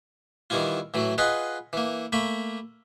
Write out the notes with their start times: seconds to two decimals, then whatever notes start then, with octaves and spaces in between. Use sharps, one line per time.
0.50 D#3 E3 G3 E4 F4
0.94 A2 E3 F#3
1.18 F4 G#4 B4 D#5 F#5
1.73 E3 A#3
2.12 A3 A#3 B5